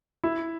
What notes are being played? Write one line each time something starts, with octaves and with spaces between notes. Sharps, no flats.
E4